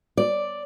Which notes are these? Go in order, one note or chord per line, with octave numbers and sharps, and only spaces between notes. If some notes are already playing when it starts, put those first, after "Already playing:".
D5